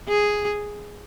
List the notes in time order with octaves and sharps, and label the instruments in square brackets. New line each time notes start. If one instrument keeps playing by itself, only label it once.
[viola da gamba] G#4